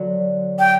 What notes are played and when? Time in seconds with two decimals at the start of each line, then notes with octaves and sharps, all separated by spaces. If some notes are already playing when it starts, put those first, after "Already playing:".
Already playing: D3 F#3
0.59 G5